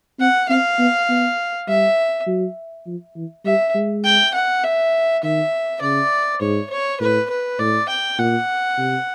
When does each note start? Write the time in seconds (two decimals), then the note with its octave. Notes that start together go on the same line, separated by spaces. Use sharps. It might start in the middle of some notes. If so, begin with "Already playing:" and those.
0.19 C4 F#5
0.49 C4 F5
0.79 B3
1.09 B3
1.68 G3 E5
2.27 F#3
2.86 F3
3.16 E3
3.45 G3 E5
3.75 G#3
4.04 G5
4.34 F#5
4.63 E5
5.23 D#3 E5
5.82 C#3 D5
6.41 G#2 C#5
6.70 C#5
7.00 A2 B4
7.30 B4
7.59 A2 D5
7.89 G5
8.18 A#2 F#5
8.78 C3